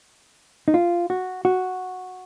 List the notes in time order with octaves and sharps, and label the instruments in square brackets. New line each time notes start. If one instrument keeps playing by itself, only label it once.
[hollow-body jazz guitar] D#4
F4
F#4
F#4